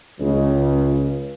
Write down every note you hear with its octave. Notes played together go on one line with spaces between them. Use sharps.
C#2